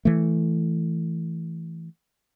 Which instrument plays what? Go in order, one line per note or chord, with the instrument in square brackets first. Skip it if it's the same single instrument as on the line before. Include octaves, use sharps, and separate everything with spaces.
[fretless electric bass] E3 A3